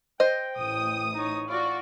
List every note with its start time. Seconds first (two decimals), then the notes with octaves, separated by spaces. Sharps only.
0.20 C5 D#5 G5
0.57 A1 D#6
1.13 D#4 C#5
1.48 F4 F#4 D5 C#6